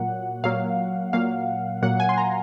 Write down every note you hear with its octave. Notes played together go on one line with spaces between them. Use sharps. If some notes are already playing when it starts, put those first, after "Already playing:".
Already playing: A#2 F#3 A#3 F#5
A#2 F#3 A#3 F5
A#2 F#3 A#3 F5
A#2 F#3 A#3 F#5
G#5
C6
A#5